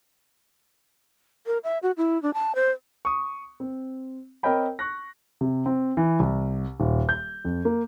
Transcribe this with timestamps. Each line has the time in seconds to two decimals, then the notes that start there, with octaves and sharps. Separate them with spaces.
1.46 A#4
1.64 E5
1.83 F#4
1.97 E4
2.22 D4
2.34 A5
2.55 C5
3.05 C#6 D#6
3.60 C4
4.43 C4 A#4 C#5 D#5 G5 B5
4.79 C#6 F#6 A#6
5.41 C3
5.66 C4
5.97 E3
6.19 C2
6.80 D#1
7.09 G6
7.45 F2
7.65 A#3